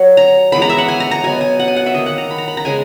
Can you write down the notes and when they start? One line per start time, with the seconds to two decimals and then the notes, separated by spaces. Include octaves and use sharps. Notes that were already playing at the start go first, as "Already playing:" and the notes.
Already playing: F#3 F#5
0.17 A#5
0.52 E3 G#3 B3 B5
0.62 A#5
0.69 E5
0.78 F#5
0.88 G#5
1.00 A#5
1.11 A#5
1.23 B2 F#3 B3 G#5
1.41 G#5
1.60 F#5
1.68 G#5
1.76 F#5
1.86 E5
1.94 D#3 A#3 D#5
2.06 F#5
2.18 A#5
2.31 B5
2.38 A#5
2.48 B5
2.57 A#5
2.65 C#3 G#3 B3 G#5